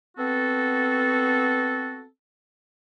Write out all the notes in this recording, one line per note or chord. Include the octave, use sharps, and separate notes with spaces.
B3 C4 F#4 A4